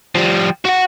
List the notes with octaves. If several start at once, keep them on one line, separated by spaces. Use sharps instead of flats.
F3 G3
F#4 F#5